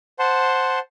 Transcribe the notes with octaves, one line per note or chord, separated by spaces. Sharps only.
C5 F#5 A5 C6